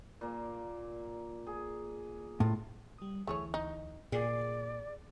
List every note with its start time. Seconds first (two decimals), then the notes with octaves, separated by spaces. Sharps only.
0.21 A#2 A#3
1.47 G#4
2.40 A2 F4
2.98 G3 D#6
3.27 D2 E3 A3 G#4 C#5
3.54 D#4
4.12 A#2 G#4 D5